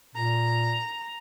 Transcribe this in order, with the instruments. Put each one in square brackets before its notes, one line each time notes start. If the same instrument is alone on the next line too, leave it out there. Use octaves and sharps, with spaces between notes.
[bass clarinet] A#2 [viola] A#5